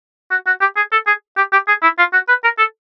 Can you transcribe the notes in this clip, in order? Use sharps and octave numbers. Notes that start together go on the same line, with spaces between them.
F#4
F#4
G4
G#4
A4
G#4
G4
G4
G#4
E4
F4
F#4
B4
A#4
A4